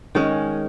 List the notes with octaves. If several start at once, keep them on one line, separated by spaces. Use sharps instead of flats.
D#3 G#3 C#4